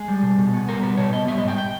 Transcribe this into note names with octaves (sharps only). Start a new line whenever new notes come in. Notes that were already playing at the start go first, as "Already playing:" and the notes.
Already playing: G#3 G#4
G3
B2
B2
B3
G3 A#4
B2 B4
B2 C#5
B3 D#5
G3 E5
D#5
G#2
G5
G5